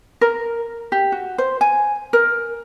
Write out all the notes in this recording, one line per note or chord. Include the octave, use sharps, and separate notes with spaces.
A#4
G4
F#4
C5
G#5
A#4